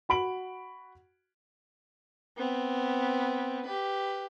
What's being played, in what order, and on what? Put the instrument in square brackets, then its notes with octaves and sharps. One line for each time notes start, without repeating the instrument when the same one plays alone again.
[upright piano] F#4 B5 D7 F#7
[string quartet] B3 C4
G4 B4